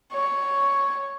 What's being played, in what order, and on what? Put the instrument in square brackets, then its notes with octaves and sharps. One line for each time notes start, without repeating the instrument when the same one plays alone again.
[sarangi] C#5